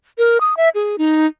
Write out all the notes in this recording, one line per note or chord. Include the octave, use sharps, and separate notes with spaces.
A#4
D#6
E5
G#4
D#4